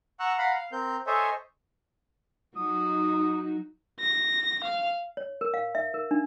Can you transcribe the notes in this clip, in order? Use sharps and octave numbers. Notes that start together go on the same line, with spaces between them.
F#5 A#5 C#6 E6 F#6
F5 F#5 A#5 B5
F5
C4 A#4 G6
A4 C5 C#5 D#5 E5 G#5
F#3 D#4 F#4 D#6
A#6
F5
C#5
A#4
F5
E5
A#4
D4